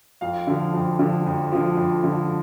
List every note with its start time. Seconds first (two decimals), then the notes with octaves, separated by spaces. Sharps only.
0.21 F2 F5
0.47 D3 F3
0.74 F2
0.99 D3 F3
1.26 F2
1.52 D3 F3
1.77 F2
2.04 D3 F3